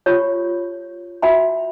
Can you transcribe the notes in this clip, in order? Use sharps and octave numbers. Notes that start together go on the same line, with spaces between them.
F4 G4 C#5
F#4 E5 G5 B5